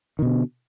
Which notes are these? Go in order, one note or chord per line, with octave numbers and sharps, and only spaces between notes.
B2 D3 D#3